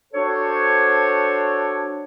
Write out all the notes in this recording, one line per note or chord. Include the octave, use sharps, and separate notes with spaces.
D4 F#4 A4 C5 C#5